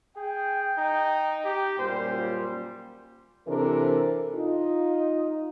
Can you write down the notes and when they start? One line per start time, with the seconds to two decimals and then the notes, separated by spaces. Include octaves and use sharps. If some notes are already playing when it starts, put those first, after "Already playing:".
0.17 G#4 G5
0.78 D#4
1.45 G4
1.79 F#2 A#2 G3 C5
3.47 C3 E3 D4 A4 A#4
4.35 D#4 F4